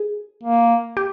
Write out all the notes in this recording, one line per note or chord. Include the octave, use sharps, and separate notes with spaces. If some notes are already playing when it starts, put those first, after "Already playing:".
Already playing: G#4
A#3
G4